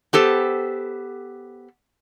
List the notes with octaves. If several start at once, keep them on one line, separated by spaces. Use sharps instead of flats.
B3 G4 A4 C5